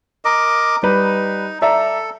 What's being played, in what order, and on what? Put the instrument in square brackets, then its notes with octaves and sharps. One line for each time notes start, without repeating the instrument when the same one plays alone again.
[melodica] A#4 D#5 D6
[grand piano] G3 B4 [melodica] D#4
[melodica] A4 [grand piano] D5 E5 A#5